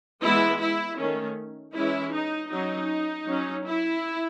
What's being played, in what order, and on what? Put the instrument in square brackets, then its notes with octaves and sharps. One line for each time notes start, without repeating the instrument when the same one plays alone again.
[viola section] E3 G#3 B3 E4
E4
D#3 A3 C#4
E3 G#3 C#4 E4
D#4
F#3 C#4 D#4
F#3 C#4
E4